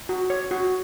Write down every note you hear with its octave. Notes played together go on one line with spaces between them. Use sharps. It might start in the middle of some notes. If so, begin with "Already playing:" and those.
F#4
C#5
F#4